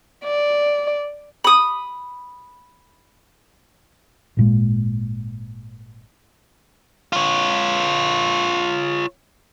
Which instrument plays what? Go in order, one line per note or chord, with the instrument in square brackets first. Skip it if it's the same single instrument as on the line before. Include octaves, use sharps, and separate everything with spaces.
[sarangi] D5
[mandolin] B5 D#6
[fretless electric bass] G#1 A#2 G#3
[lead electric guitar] F4 C#5